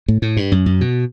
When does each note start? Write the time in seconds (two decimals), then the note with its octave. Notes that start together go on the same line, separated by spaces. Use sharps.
0.08 A2
0.22 A2
0.37 G2
0.52 F#2
0.66 F#2
0.81 B2